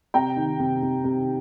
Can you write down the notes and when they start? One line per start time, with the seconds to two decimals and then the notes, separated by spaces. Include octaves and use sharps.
0.14 C3 G5 A#5
0.36 D#3
0.59 C3
0.82 C3
1.04 C3